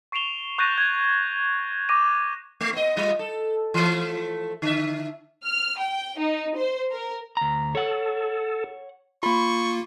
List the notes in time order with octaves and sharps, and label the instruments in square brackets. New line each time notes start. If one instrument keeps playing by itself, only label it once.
[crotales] C#6 C7 D7 E7 F7 G7
C#6 F#6 G6 A6 A#6 D#7
G#6
C#6 D6 A#6 D#7
[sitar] A3
B3 D#5
G3 F4 D#5
A4
E3 F3 A3
D3 E5
[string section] F6
G5
D#4
C5
A#4
[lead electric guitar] D2 A#5
[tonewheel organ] A4 [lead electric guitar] C#5 F#5
[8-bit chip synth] A#3 F4 [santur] B5 [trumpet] C#6